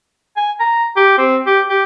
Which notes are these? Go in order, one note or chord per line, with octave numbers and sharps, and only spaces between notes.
G#5
A#5
G4
C4
G4
G4